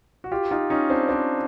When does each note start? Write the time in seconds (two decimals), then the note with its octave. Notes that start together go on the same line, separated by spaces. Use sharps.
0.24 F#4
0.31 F4 G4
0.51 D#4 F4
0.70 C#4 D#4
0.90 C4 D4
1.09 C4 D4